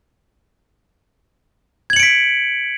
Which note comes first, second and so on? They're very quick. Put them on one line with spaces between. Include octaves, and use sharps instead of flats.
G#6 F#7 C#7 D7 B6